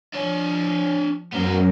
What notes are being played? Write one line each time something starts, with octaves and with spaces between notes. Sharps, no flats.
F3 D4 C#5
F#2 A#3 B3 C5